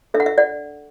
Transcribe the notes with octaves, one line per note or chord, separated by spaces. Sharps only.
D4 A4 E5
F#5
E5
D5 F#5